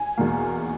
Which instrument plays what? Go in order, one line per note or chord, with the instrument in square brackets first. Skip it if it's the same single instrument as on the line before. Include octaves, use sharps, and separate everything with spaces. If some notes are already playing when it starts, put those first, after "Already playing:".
Already playing: [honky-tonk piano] G#5
E2 B2 A#3